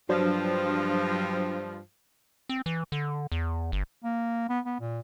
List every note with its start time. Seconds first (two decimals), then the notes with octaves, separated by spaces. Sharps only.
0.09 G2 F3 F#3 D4 C5
2.49 C4
2.66 E3
2.92 D3
3.32 E2
3.72 G1
4.04 A#3
4.49 B3
4.66 B3
4.80 A#2